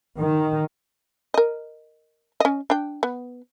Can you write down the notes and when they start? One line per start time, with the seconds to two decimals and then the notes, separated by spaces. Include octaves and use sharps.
0.20 D#3
1.34 A#4 D#5
2.40 C#4 D#5
2.70 D4 G5
3.03 B3